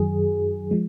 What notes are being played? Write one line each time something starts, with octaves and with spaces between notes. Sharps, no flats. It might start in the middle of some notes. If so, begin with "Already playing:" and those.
Already playing: F#2 D#3 F#3 G#4
F3 G#3